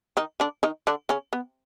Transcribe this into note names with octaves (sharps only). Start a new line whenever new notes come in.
D#3 D#4
D3 D4
D#3 D#4
D3 D4
C#3 C#4
B3